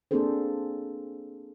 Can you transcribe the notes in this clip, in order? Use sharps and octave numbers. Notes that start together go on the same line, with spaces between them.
A#3 C4 D4 G#4 A4 C5